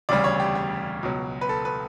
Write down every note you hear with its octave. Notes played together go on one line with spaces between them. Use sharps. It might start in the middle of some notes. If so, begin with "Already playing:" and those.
E1 D2 C#3 G3 D5
C#5
G4
G4
C#2 B2 F#3
B4
A4
B4